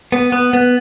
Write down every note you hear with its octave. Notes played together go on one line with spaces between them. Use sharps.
B3
B3
B3